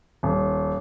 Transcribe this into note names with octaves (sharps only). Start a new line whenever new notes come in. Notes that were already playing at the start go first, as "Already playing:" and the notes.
D#1